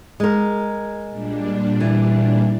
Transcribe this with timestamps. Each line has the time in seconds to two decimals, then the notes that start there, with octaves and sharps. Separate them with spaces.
0.20 G#3 A#4
1.10 A#2 G3 D4
1.80 E3